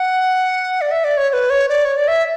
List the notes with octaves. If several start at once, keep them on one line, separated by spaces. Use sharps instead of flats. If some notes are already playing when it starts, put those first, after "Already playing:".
Already playing: F#5
D5
E5
D5
C#5
C#5
B4
C#5
D5
C#5
D5
E5